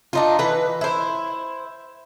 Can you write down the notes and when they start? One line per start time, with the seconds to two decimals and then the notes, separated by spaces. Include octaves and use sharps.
0.13 D4 D#4 F4
0.39 E3 B4
0.81 E4 C5